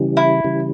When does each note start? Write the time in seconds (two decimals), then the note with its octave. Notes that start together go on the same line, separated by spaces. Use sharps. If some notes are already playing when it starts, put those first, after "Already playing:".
Already playing: C#3 E3 G3
0.17 E4
0.44 C#3 E3 G3